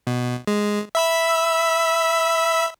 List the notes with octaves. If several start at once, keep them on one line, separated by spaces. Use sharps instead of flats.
B2
G#3
E5 B5 E6